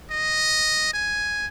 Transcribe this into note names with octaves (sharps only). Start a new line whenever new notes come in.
D#5
G#5